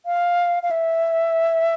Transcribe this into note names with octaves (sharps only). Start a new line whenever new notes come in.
F5
F5
E5